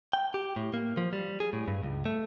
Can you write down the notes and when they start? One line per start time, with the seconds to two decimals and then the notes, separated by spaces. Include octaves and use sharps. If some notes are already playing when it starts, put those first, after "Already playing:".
0.13 G5
0.34 G4
0.56 A2
0.74 A#3
0.97 F3
1.13 G3
1.40 G#4
1.53 A2
1.68 G2
1.83 C#2
2.05 A3